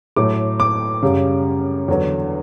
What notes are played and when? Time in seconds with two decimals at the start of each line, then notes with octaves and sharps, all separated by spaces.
0.16 A2 F#3 A3 D6
0.60 D6
1.03 F#2 C#3 G3
1.88 E2 D3 F#3